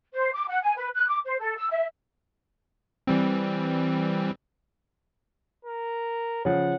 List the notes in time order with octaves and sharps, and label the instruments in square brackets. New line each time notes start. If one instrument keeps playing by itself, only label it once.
[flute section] C5
D6
F#5
G#5
B4
F#6
D6
C5
A4
E6
E5
[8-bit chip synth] E3 G3 C4
[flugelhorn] A#4
[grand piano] C#3 F3 [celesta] C#5 [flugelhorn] F#5